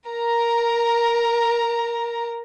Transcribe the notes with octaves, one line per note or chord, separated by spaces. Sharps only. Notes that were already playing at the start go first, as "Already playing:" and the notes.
A#4 A#5